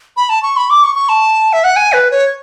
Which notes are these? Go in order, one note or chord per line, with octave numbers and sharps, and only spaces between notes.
B5
A5
C#6
B5
D6
C#6
C#6
A5
E5
F#5
G#5
B4
C#5